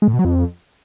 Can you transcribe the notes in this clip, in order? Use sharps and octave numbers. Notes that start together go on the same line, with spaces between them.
G#3
A2
B2
F#3
F2